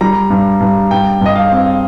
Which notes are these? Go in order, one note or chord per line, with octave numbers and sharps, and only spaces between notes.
G3 A#5
G2
G2
G2 G5
G2 D#5
F5
C4